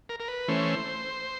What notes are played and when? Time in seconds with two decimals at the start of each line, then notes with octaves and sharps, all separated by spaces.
0.09 A#4
0.20 A#4
0.28 B4
0.48 E3 A3 C#4 C5